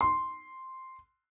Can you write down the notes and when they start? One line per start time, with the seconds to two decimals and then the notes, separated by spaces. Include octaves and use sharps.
0.01 C6